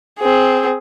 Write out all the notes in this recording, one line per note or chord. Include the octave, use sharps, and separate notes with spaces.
C4 G#4